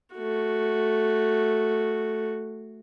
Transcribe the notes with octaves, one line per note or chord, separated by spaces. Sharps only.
A3 F#4